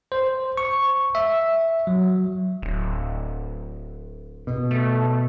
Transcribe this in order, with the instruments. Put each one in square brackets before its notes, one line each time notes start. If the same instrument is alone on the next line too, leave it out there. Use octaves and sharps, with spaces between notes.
[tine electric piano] C5
C#6
E5
F#3
[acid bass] D1
[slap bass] B2
[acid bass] A3